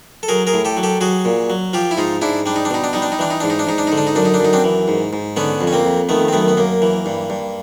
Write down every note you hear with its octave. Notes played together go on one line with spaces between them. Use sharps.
A4
F#3 G#4 A#4
G#4 A#4
A2
G4 A4
F#3
G4 A4
F#3 F#4 G#4
A#2
F#3
F3 F4 G4
E4
G#2 D#4 F4
G#2 D4 E4
G3 D4
D#4
D4
B2 D#4
D4
G3 D#4
D4
D#4
E3 D4
D#4
G#2 D4
D#4
D4
G#2 D#4
D4
D#4
D3
D4
D#4
F#2 D4
D#4
D4
F#2 D#4
C4 D4
E3
G#2
G#2
D3 B3 C#4
F2
C#4
A#3 C4
F2
D#3 A3 B3
C4
F#2 A3 B3
B3
F#2 A#3
E3
G2
G2